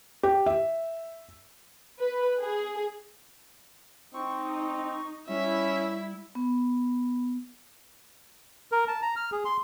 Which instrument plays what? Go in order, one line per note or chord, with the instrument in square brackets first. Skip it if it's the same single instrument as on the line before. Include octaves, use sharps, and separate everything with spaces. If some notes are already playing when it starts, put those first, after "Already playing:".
[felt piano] G4
E5
[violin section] B4
G#4
[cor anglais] C4 [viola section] D#4 [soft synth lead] C#6
[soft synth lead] G3 [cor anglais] C#4 [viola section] E4 [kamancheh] E5
[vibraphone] B3
[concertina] A#4
A5
A#5
F6
G#4
C6